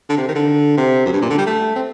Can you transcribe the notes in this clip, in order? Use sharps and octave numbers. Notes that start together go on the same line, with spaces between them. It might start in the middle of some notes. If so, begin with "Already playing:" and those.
D3
C3
D#3
D3
C3
F#2
G2
A#2
D3
G3
A3
C4